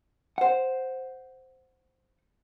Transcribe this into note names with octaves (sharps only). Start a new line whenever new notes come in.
C5 F#5